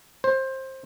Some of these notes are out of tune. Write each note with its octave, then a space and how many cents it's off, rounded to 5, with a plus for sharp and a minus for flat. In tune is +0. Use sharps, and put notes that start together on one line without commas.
C5 +20